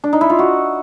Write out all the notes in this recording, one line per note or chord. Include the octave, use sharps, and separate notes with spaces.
D4
D#4
E4
F4
F#4